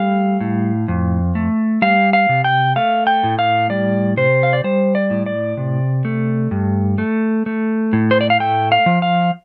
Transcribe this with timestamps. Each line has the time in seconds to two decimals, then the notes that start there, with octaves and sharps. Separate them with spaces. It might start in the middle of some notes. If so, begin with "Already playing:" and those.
Already playing: G3 A3 F5
0.40 A2
0.88 F2
1.35 A3
1.82 G3 F5
2.13 F5
2.29 C3
2.44 G5
2.76 A3 F5
3.07 G5
3.24 A2
3.39 F5
3.70 G3 D5
4.17 C3 C5
4.43 F5
4.53 D5
4.64 G3 C5
4.95 D5
5.10 A2
5.26 D5
5.57 C3
6.05 A3
6.51 G2
6.98 A3
7.46 A3
7.93 A2
8.11 C5
8.21 D5
8.30 F5
8.40 A3 G5
8.72 F5
8.86 F3
9.02 F5